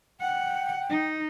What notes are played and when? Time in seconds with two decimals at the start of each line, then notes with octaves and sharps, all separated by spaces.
0.20 F#5 G5
0.89 D#4